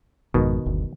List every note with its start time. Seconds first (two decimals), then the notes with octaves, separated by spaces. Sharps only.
0.34 G#1 F2 G#2 B2 D#3
0.66 F#1 D2